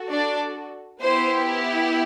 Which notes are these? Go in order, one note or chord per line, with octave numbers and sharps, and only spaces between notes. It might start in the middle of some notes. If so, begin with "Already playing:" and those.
Already playing: F#4 A4
D4 D5
B3 E4 G4 C5